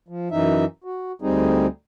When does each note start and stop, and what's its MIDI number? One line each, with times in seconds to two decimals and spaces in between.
0.08 0.28 53
0.31 0.65 42
0.31 0.65 52
0.31 0.65 63
0.31 0.65 76
0.84 1.12 66
1.22 1.67 38
1.22 1.67 55
1.22 1.67 60
1.22 1.67 63
1.22 1.67 68